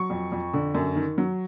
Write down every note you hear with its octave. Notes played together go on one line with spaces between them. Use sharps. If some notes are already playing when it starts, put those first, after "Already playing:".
Already playing: F#3 C#6
F2
F2
D3
F#2
D#3
F#3